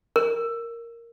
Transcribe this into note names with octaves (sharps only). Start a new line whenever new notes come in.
A#4